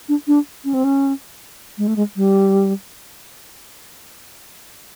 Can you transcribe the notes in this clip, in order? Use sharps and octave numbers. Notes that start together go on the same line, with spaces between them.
D4
D4
C#4
C4
C#4
G#3
A3
G#3
G3